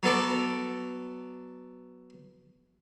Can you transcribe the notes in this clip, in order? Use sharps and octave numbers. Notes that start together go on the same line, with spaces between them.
F#3 B3 A4 D5